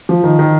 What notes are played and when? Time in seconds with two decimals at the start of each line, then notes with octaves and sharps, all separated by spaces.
0.09 F3
0.24 D#3
0.39 D#3